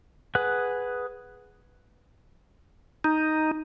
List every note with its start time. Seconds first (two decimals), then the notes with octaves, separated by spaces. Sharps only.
0.35 G#4 B4 F#5
3.04 D#4